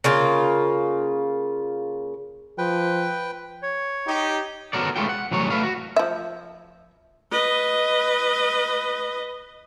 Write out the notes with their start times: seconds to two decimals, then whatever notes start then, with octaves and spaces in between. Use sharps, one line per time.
0.04 C#3 A#3 F4
2.58 F3 B4 G5
3.63 C#5
4.07 D#4 G4
4.73 B3 F#4 A4 A#4 C#5 D5
4.96 G#3 A3 B3 F4 G5
5.09 F#5
5.31 C2 E3 F#3 A3 C#5
5.50 A3 A4 B4 F5
5.63 F#4
5.96 F3 E5
7.32 B4 D#5